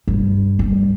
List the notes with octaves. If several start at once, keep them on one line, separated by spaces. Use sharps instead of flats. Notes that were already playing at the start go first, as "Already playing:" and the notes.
G2
G2